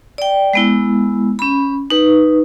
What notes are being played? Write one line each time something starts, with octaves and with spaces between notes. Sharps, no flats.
D5 G5
G#3 B3 E4
C#4 B5
D#4 B4